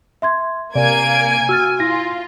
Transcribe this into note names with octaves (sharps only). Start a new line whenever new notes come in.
E5 C6 G#6
C3 A#3 D5 G#5 G#6 D7
F#4 E6 F6 A6
E4 F4 A#6